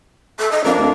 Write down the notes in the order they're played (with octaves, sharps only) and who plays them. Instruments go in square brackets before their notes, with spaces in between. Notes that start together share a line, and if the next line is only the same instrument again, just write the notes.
[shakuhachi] A4
D#5
[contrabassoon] F2 [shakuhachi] D4 [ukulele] A#4 F5
[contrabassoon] D2